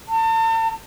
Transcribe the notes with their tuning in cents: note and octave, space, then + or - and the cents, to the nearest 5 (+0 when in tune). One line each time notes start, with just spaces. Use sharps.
A5 +40